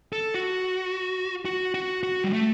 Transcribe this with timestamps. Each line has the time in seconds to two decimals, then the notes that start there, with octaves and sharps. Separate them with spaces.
0.13 A4
0.34 F#4
1.45 F#4
1.74 F#4
2.03 F#4
2.24 G3
2.33 A3